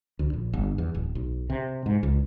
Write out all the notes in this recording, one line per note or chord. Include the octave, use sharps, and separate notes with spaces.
D2
A#1
G1
E2
D1
B1
C3
G#2
C#2